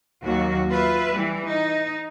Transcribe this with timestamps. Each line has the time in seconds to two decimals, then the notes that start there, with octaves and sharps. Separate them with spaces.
0.23 D#2 F#3 A#3 F#4
0.69 F4 B4 E5
1.13 E3 G3
1.44 D#4